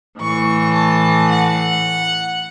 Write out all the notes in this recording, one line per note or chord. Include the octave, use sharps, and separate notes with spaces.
A2 E3 C#6
A5
F#5